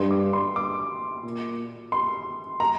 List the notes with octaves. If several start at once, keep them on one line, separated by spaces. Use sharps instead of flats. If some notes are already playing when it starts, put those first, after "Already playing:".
Already playing: G2 C6
D6
C6
D6
A#2
C6
A#5